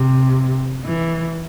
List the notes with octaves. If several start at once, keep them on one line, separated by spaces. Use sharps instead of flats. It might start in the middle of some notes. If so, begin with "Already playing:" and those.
Already playing: C3
E3